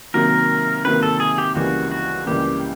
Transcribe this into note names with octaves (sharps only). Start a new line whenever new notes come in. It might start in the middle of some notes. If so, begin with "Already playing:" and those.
C3 D#3 F#3 A#3 A#4
C3 D#3 F#3 A#3 B4
A4
G#4
G4
C#2 C#3 E3 G3 A#3 F#4
F#4
C#2 C#3 E3 G3 A#3 G4